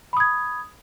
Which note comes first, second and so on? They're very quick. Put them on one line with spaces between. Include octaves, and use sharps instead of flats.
B5 D#6 G#6